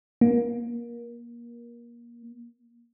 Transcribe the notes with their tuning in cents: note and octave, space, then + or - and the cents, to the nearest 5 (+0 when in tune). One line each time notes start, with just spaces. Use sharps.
A#3 +25